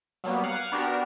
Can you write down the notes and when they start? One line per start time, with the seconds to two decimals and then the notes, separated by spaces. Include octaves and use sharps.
0.24 F#3 G3 A#3 B3
0.44 F5 F#5 G#6 D7 D#7
0.72 B3 D4 F#4 G4 A#4